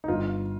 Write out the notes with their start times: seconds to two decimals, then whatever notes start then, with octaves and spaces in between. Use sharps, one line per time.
0.04 D#4
0.08 G1 F4